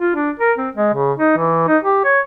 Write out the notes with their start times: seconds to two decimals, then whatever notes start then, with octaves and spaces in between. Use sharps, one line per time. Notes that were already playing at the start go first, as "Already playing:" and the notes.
0.01 F4
0.15 D4
0.40 A#4
0.58 C4
0.75 G#3
0.94 C#3
1.18 D#4
1.37 E3
1.68 D#4
1.83 G4
2.05 C#5